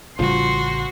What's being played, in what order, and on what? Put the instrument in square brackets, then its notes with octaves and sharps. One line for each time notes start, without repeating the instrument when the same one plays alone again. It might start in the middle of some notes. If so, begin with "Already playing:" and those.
[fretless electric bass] A1 C#3 G3 [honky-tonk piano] F3 [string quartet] F#4 [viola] C6